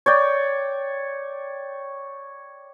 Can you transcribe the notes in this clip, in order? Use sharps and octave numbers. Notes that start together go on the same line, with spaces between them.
C#5 D5 G5